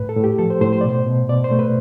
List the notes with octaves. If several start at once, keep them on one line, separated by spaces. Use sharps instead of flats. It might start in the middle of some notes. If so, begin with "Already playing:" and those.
Already playing: A2 B4
A4
A2
G4
F3 A4
C5
A2 C5
C5
B2 D5
C5
B2
B2 D5
C5
A3
B4